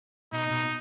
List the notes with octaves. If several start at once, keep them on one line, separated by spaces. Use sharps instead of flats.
B2 D#4
B2